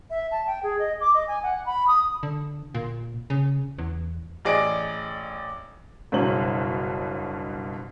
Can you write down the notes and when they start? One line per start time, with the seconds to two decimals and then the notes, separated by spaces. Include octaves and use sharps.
0.10 E5
0.31 A5
0.47 G5
0.63 G#4
0.79 D#5
1.01 D6
1.14 D#5
1.28 G#5
1.43 F#5
1.66 B5
1.87 D#6
2.23 D3
2.74 A#2
3.30 C#3
3.78 E2
4.45 A1 G#4 D5 D#5 D7
6.12 F#1 G2 B2 C5 C#5 F#7